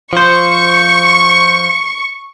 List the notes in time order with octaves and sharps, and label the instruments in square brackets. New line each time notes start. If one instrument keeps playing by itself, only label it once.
[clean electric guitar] F3 C5 [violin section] C#6